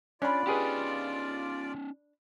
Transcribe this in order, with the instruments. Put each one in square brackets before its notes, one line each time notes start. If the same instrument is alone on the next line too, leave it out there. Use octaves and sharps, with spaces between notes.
[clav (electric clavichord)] C#4 [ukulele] D4 B5 [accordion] F4 D5
[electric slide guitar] C#4 D#4 [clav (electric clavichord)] G4 G#4 B4